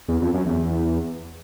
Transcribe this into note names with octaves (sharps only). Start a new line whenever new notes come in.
E2
F2
F#2
E2